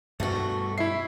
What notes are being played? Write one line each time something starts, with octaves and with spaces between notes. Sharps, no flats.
G2 B2 G3 A3 F#4
E4 E5 C7